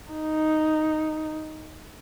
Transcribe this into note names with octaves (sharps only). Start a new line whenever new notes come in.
D#4